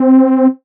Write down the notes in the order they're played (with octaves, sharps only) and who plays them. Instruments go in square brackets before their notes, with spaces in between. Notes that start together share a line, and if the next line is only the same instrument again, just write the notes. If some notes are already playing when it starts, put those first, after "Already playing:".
Already playing: [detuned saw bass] C4